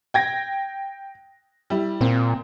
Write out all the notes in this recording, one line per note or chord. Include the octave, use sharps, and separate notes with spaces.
G5 G#6 A#6
G3 E4
A#2 C4